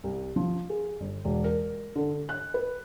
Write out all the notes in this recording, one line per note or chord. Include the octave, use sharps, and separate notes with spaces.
C2
F3
G#4
G1
E1
A#4
D3
F#6
B4